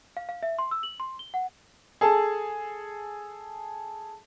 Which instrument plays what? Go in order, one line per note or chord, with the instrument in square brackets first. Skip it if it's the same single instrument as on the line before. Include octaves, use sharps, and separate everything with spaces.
[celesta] F5
F5
E5
C6
E6
F#7
C6
G7
F#5
[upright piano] G#4 A4 A5